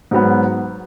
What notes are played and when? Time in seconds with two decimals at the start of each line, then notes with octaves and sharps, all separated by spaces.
0.11 G#2 F#3 B3